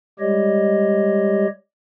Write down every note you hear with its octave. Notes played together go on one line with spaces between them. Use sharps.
G3 G#3 G4 C#5 D#5